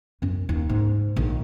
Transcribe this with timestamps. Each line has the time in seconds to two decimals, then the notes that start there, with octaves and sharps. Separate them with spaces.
0.22 F#2 C#4
0.49 D#2
0.69 G#2
1.16 A#1 D#3